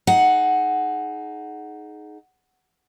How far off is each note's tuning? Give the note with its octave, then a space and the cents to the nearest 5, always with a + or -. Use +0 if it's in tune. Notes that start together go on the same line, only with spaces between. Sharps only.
D#4 +0 G#4 +25 F#5 +0